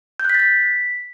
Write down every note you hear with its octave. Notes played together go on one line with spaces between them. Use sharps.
G6
F#6
B6
A6
B6